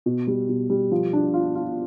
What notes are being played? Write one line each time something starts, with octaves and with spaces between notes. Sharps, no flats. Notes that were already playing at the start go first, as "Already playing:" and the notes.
B2
G3
B2
G3
F3
D4
F4
F4